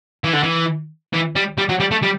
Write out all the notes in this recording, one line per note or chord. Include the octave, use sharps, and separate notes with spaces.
E3
D3
E3
E3
G3
G3
F#3
G3
A3
G3